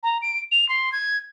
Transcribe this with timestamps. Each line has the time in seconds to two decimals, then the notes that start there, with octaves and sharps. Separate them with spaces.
0.03 A#5
0.22 D7
0.52 F7
0.69 C6
0.92 G#6